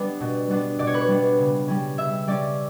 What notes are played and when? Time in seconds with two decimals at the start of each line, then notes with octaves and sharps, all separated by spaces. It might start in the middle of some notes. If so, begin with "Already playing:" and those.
Already playing: G3 B3 D4 B4 D5
0.21 B2
0.50 G3 B3 D4
0.79 B2 D5
0.87 C#5
0.94 B4
1.00 C#5
1.08 G3 B3 D4
1.38 C#3
1.68 G3 C#4
1.98 C#3 E5
2.27 G3 C#4 D5